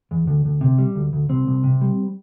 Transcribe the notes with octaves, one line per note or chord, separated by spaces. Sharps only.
E2
D2
D2
C3
G3
D2
D2
C2 C4
C2
C3
G3